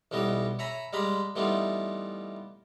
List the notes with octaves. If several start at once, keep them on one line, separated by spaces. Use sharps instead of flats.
B1 E3 G3 B3 D#5
C#5 E5 G#5 A#5 B5
G3 G#3 F5 A#5 B5
E3 G3 A3 B3 D#4 F4